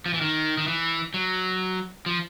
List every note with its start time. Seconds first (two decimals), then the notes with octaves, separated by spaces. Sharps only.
0.06 F3
0.14 E3
0.21 D#3
0.58 D#3
0.68 E3
1.14 F#3
2.06 F3